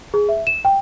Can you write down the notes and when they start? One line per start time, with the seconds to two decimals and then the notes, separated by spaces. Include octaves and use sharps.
0.14 G#4
0.29 E5
0.47 E7
0.65 G5